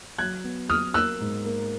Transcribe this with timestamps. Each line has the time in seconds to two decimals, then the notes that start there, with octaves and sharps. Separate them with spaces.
0.18 F#3 F#6 G#6
0.44 B3
0.69 F#3 D#6 F6
0.94 A#3 E6 F#6
1.20 G#2
1.46 A#3